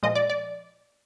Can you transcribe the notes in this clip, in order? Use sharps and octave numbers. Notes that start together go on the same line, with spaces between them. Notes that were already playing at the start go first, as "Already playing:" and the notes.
A#2 F3 G#3 D#5
D5
D5